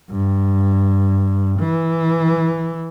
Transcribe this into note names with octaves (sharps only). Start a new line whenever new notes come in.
G2
E3